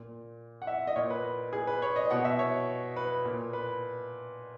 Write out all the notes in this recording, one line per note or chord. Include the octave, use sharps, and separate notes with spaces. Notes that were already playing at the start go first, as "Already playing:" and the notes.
Already playing: A#2
F#5
E5
D#5
A#2 C#5
B4
G#4
B4
C#5
D#5
B2 F#5
E5
C#5
B4
A#2
B4